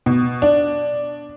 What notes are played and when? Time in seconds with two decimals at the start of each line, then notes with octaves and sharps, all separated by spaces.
0.06 B2
0.42 D4